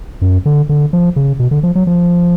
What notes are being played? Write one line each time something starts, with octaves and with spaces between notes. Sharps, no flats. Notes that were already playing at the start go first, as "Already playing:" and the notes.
F#2
D3
D3
F3
C#3
B2
D3
F3
F#3
F3